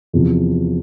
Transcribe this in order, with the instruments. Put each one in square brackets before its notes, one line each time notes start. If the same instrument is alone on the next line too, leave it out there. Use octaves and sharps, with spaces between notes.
[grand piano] E2 C3 F3